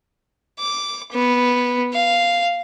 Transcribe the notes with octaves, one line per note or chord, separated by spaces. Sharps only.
D6
B3
F5